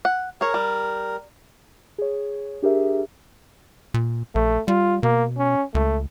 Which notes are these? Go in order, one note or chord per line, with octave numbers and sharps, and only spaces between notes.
F#5
G#4 A#4 C#5
G3
G#4 C#5
D4 G4 G#4 A#4 E5
A#2
A#1 A3
G3 F4
B2 A#3
C#4
C#2 A3